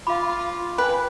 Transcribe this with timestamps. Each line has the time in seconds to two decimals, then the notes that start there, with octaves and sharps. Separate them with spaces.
0.07 F4 F5 B5 D6
0.78 B4 G5 G#5 F#6